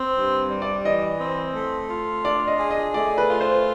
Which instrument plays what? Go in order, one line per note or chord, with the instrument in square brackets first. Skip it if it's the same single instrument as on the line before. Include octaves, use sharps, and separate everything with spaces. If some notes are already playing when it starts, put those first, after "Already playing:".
Already playing: [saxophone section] C4
G2
G3
[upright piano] D5
[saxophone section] E3 [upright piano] D#5
[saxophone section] C4
A3
F4
[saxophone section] D4 [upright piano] D5
[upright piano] D#5
[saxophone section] G#4
[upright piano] D#5
[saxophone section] A3 [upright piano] D5
[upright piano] B4
[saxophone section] F4
[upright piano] C5